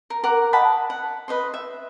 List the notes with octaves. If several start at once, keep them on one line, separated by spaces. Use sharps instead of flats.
A#4
A#4 F#5 D6
D#5 F#5 A5 B5
F#5
B4 D#5 C6
E5